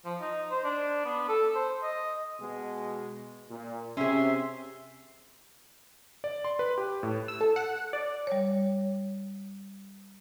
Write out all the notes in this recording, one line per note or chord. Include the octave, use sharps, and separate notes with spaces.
F3
D#4
C5
D4
B3
A4
C5
D#5
B2 G#3
A#2
C3 C#4 G#4 E5 C6
D5
C6
B4
G4
A2
E6
A4
F#5
D5
G3 C#5